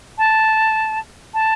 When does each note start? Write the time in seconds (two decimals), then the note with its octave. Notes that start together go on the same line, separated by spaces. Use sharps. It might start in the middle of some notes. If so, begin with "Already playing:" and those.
0.18 A5
1.34 A5